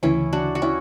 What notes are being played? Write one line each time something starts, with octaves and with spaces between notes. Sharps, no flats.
D2 C#3 E3 C#4 E4
D4 F#4
F#4
C#4 E4